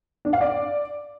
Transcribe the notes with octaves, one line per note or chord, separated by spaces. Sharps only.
D4
F5
D5